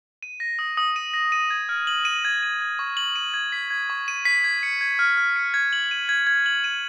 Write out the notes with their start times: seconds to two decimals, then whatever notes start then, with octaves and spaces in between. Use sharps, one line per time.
0.23 D#7
0.40 A#6
0.59 D#6
0.77 D#6
0.96 D#7
1.14 A#6
1.32 D#7
1.50 G#6
1.69 F6
1.87 F#7
2.05 D#7
2.25 G#6
2.43 D#7
2.61 G#6
2.79 C#6
2.97 F#7
3.16 D#7
3.34 G#6
3.52 B6
3.70 G#6
3.90 C#6
4.08 D#7
4.25 B6
4.44 G#6
4.63 C#7
4.81 G#6
4.99 F6
5.17 F6
5.36 C#7
5.54 G#6
5.73 F#7
5.91 D#7
6.09 G#6
6.27 G#6
6.46 F#7
6.64 D#7